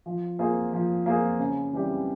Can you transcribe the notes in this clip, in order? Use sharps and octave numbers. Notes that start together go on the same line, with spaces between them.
F3
A#3 F4 G#4 C5
F3
A#3 F4 G#4 C5
C#3
E3 G3 C4 G4